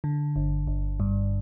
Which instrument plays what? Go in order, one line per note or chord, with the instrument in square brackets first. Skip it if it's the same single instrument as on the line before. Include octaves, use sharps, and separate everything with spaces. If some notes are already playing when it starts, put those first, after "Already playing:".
[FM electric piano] D3
G1
G1
G2